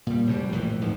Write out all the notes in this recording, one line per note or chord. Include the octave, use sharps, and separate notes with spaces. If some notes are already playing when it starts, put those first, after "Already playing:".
A#2 G3
F1 F#2 G3
A#1 A2 E3
D1 G#2 F3